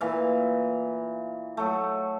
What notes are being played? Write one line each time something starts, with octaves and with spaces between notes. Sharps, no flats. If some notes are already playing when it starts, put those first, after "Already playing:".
A#2 E3 F5
F#3 A3